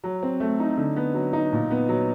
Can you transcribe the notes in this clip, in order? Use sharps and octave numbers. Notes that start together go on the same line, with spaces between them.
F#3
C4
A3
D#4
D3
B3
F#3
D#4
A#2
B3
F#3